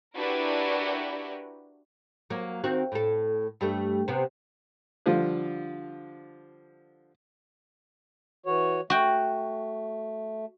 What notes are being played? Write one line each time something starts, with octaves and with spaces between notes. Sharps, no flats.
D4 E4 F#4 G4 A#4 B4
F#3 A#3
D#3 C4 F#4
A2 A4
G2 G3 A3
C3 B3
D3 F3 G3 F4
E3 F#4 C#5
A3 F#4 G5